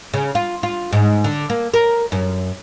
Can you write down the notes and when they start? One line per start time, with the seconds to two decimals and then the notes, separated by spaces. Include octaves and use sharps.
0.14 C#3
0.35 F4
0.63 F4
0.93 G#2
1.24 D3
1.50 A#3
1.74 A#4
2.12 F#2